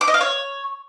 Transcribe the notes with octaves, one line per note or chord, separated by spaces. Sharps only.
D6
D#5
F5
C#5